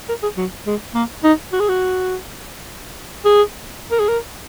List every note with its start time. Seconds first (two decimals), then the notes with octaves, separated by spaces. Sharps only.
0.09 A#4
0.23 G#4
0.37 F#3
0.66 G#3
0.94 A#3
1.24 D#4
1.52 F#4
1.60 G#4
1.69 F#4
3.25 G#4
3.91 A#4
4.00 G#4
4.08 A#4